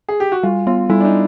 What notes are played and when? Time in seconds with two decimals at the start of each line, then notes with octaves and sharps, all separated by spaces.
0.09 G#4
0.20 G4
0.32 F#4
0.43 G3 F4
0.67 B3 F4
0.90 G3 E4
1.00 D4
1.05 D#4